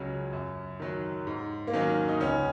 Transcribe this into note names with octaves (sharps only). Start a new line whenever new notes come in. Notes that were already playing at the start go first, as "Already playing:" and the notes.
Already playing: C#2 C#3 F#3 C#4
F#2
D#3 F#3
G#2
A#3
D#3 F#3 C#4
D#4
C#2 C#4